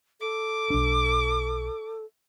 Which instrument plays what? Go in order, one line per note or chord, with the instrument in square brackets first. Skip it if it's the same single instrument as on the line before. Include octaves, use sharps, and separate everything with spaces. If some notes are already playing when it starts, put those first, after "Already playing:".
[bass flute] A4 [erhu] D6
[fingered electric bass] B1 D4